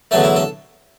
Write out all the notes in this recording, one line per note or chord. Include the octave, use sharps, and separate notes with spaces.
E2 D3 F#3 A3 A4
E4
A4